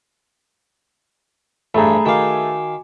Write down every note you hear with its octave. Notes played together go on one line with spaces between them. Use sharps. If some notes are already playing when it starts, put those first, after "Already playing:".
A1 G2 A3 G#4 A#5 B5
D#3 F#4 F5 G#5 D6